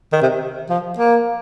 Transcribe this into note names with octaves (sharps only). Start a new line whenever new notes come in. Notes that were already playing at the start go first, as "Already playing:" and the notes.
D#3
C3
F3
A#3